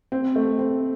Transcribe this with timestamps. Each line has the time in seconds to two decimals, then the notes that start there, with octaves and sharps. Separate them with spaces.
0.12 C4
0.36 A3
0.59 C4